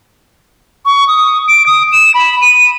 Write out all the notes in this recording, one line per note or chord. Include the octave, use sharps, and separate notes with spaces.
C#6
D#6
D7
D#6
E7
B5
D#7